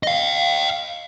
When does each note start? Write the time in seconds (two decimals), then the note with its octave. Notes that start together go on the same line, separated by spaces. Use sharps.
0.03 D#5 F5